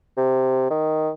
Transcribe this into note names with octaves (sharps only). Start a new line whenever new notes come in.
C3
D#3